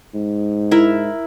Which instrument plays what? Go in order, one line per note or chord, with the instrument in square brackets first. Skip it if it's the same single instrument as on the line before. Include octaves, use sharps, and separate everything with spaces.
[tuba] G#2
[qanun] E4 A#4 E5